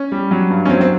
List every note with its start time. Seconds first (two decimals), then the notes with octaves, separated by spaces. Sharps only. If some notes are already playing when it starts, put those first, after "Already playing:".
Already playing: C#4
0.12 G3
0.31 F#3
0.50 G2
0.65 C#4
0.69 F#3 C4
0.81 C4